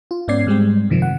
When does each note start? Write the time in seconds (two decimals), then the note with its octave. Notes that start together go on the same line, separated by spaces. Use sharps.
0.11 F4
0.28 G#2 B3 C#4 D5 G#6 C7
0.47 G#2 G3 G#3 C4
0.90 F#2 C3 D#3 F3
1.02 F#5